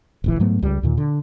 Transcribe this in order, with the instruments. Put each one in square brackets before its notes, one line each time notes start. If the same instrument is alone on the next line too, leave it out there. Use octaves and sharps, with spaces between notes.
[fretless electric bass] D1 A#1 E3
G#2 F#3 A3 B3
C#2 G3
D#2 A#2 D#3
D3